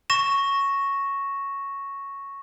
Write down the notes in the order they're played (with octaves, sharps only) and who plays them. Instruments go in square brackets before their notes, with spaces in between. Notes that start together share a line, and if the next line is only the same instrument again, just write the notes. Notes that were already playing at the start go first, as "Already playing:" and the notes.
[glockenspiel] C#6 A#6 E7